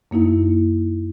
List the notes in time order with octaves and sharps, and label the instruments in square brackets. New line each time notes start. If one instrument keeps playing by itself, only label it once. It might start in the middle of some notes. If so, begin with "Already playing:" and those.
[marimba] F#2 A#3 D#4 E4